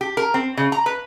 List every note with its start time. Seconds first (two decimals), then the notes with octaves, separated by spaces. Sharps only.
0.01 G4
0.17 A#4
0.34 C4
0.57 C#3
0.72 A#5
0.86 B4